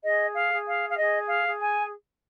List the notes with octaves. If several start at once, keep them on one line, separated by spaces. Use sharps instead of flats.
G#4 D#5
F5
G#4
F5
F5
G#4 D#5
F5
G#4
G#5